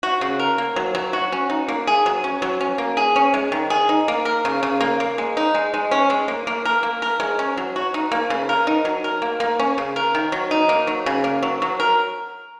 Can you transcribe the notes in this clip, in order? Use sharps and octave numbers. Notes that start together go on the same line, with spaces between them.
F#4
C#3
A#4
A#3
F#3
F#3
F#4
C#4
D#4
A#3
G#4
F#3
C#4
F#3
C#4
A#3
G#4
C#4
G#3
D#3
G#4
D#4
A#3
A#4
C#3
C#3
A#3
A#3
G#3
D#4
G#3
G#3
C#4
G#3
A#3
A#3
A#4
A#3
A#4
G#3
C#4
F#3
F#4
D#4
A#3
C#3
A#4
D#4
F#3
A#4
A#3
A#3
C#4
C#3
A#4
D#3
F#3
D#4
A#3
F#3
C#3
A#3
F#3
F#3
A#4